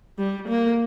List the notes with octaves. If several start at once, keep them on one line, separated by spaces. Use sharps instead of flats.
G3
A#3